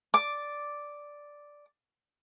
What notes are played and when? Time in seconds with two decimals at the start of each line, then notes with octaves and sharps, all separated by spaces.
0.14 D5 D6